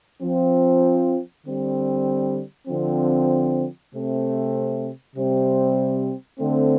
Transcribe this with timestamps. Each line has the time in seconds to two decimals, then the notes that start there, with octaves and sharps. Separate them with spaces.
0.21 F3 C4
1.44 D3 G3 C4
2.67 D3 F3 C4
3.91 C3 A3 C4
5.15 C3 G3 C4
6.38 D3 A3 C4